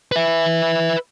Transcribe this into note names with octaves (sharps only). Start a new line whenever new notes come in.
B4 E5